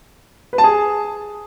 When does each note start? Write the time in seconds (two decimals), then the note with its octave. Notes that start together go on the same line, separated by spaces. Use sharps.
0.53 B4
0.58 A5
0.64 G#4